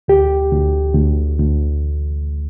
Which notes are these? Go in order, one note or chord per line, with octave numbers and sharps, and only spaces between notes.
D2 G4
D2
D2
D2